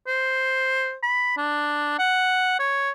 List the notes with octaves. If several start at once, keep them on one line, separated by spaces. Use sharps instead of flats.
C5
B5
D4
F#5
C#5